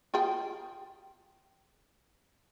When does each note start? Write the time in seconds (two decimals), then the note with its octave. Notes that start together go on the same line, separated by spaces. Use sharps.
0.14 F4 G#4 G5